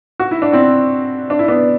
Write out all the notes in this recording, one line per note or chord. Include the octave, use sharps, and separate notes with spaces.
F#4
E4
D4
C4 E4
D4
E4
B3 D4